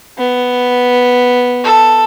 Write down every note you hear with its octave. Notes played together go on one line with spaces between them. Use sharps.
B3
A4